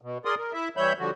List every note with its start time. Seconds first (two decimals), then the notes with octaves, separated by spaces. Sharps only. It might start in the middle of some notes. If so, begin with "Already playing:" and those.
0.02 B2
0.25 G#4 A#4 D5 C6 D#6
0.37 A#4
0.53 E4 E5
0.77 E3 G3 C#5 E5 B5 G6
0.99 D3 F3 G3 F#4